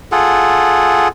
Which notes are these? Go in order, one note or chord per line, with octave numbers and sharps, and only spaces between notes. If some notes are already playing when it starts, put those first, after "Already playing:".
F4 G#4 A4 F#5